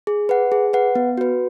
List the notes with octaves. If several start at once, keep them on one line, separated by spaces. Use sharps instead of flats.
G#4
B4 F#5
G#4
B4 F#5
B3
F#4 B4